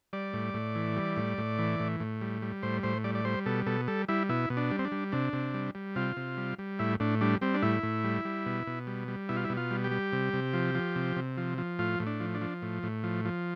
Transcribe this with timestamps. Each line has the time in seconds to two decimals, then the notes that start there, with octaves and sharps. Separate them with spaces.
0.13 G3 D5
0.33 A2
0.54 A2
0.75 E3
0.96 G3
1.17 A2
1.38 A2
1.59 E3
1.80 A2
2.00 A2
2.21 G3
2.42 G3
2.63 A2 C5
2.83 A2 C5
3.04 G3 D5
3.15 D5
3.25 G3 C5
3.46 B2 A4
3.66 B2 A4
3.88 G3 A4
4.08 G3 E4
4.29 B2 E4
4.50 B2
4.57 D4
4.71 G3
4.79 C4
4.85 D4
4.92 G3
5.12 C3 D4
5.33 C3
5.54 G3
5.75 G3
5.96 C3 F4
6.17 C3
6.38 G3
6.59 G3
6.79 A2 E4
7.00 A2 D4
7.21 G3 D4
7.42 G3 C4
7.54 D4
7.62 A2 E4
7.83 A2
8.04 G3
8.25 G3
8.46 B2
8.67 B2
8.87 G3
9.08 G3
9.29 B2 E4
9.36 F4
9.44 E4
9.50 B2
9.57 F4
9.71 G3
9.84 G4
9.91 G3
10.12 C3
10.33 C3
10.53 F3
10.75 F3
10.96 C3
11.16 C3
11.37 F3
11.58 F3
11.79 A2 F4
12.00 A2
12.07 D4
12.20 F3
12.34 D4
12.42 F3
12.62 A2
12.83 A2
13.04 F3
13.25 F3